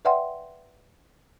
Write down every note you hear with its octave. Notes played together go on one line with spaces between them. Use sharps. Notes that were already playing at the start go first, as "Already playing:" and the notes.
B4 D5 E5 F#5 G5 C6